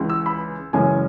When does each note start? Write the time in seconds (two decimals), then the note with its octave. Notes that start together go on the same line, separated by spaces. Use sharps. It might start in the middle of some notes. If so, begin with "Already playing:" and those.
Already playing: C#2 C#3 E3 G#3
0.10 E6
0.26 B5
0.73 F#1 F#2 E3 G#3 C#4 G#5